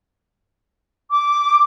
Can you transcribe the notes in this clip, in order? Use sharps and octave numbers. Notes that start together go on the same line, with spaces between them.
D6